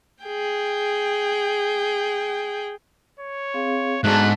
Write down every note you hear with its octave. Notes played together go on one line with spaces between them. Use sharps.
G#4 G5
C#5
C4 G#4 F5
G#2 A3 B3 D4 F#4 G#4 F#6